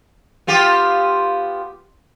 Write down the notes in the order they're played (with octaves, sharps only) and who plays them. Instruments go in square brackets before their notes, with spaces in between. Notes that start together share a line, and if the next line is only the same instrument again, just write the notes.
[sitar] B3 F4 G4